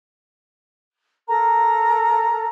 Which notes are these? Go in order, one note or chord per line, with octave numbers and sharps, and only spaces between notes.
A4 A#4 A#5